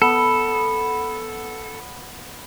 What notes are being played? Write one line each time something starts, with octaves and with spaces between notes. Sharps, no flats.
B3 A4